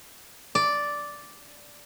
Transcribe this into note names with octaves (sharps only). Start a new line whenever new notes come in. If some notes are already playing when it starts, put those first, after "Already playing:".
D5